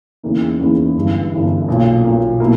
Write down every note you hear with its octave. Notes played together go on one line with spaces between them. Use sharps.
E2 C#3 E3 A#3 D#4
E2 C#3 E3 A#3 D#4
G1 G2 E3
G1 G2 E3
B1 A#2 A#3
B1 A#2 A#3
B2 A#3 E4